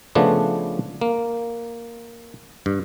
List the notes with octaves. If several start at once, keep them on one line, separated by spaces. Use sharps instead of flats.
C#3 F3 A3 B3 D4
A#3
G2